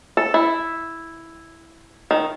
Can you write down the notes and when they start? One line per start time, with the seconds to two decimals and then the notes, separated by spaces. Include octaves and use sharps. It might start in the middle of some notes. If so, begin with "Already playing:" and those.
0.17 A4
0.34 E4
2.11 D#3